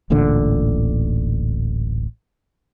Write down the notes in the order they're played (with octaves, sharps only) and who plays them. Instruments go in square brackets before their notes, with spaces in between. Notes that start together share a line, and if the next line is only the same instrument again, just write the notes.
[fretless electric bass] D1 A1 A#2 D3